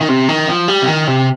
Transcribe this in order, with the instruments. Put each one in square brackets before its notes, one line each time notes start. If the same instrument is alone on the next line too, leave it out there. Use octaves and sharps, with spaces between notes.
[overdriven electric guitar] D#3
C3
D#3
F3
G3
C3
D#3
C3